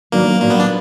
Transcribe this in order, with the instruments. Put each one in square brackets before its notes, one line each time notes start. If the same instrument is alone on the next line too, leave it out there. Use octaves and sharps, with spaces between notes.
[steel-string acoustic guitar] D#3 F#3 B3 D4 [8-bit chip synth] A#3
[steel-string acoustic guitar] A#2 F#3 D4 [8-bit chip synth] A#3
[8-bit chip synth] B3
D4